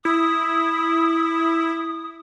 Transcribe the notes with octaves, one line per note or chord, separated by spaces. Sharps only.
E4 D#6